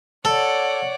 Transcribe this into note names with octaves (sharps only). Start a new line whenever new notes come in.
A4 C#5 D5 F#5